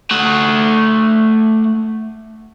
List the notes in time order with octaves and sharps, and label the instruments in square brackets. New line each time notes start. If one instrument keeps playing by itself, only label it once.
[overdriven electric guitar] A3 F#5